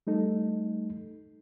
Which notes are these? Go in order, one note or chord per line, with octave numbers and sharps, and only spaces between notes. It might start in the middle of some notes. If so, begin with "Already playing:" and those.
G3 A3 D#4 A4